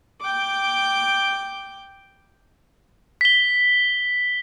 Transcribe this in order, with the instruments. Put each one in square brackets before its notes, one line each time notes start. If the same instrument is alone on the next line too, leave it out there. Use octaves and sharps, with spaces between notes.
[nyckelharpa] G5 D6
[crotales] B6 G7